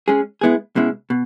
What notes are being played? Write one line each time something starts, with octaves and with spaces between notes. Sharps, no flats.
G#3 C#4 G#4
G#3 B3 E4 G#4
B2 G#3 C#4 E4
B2